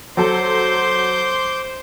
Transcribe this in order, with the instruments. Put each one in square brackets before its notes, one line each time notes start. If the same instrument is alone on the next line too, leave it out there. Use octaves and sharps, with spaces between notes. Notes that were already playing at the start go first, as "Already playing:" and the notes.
[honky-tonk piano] F#3 A4 [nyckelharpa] C5 [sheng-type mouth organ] C6 D6 G6